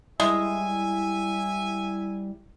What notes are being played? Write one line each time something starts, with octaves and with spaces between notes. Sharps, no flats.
G3 G#3 E4 E5 G#5